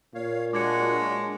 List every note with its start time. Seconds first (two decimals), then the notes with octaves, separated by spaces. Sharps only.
0.14 A#2 C#5 F5
0.53 F#3 G#3 D4 F#4 D6 G#6 C#7